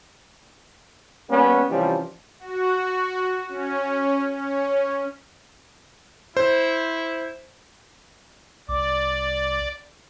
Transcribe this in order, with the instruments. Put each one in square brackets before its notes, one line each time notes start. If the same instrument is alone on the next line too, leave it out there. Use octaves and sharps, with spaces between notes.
[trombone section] G3 A#3 B3 C#4
C3 E3 F3 G3 C#4
[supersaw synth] F#4
C#4
C#4
[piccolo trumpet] E4 [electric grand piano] C5
[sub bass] C2 [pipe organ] D5 [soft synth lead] D6